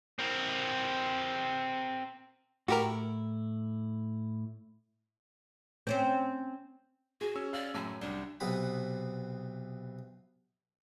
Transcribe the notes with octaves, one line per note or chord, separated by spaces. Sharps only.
C4 A#4
A2 E4 F#4 G4 A#4
C4 C#4 C5
F#4 G#4
C#4 E6
D5 F5
F#2 A2 G#5
C2 G3 D4
B1 C3 B3 C4 F#5 B5